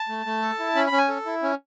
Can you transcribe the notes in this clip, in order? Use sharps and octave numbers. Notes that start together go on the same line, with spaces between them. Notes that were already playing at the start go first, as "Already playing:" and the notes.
Already playing: A5
A3
A3
A4
E4
C#4 B5
B5
C#4
G#5
A4
E4
C#4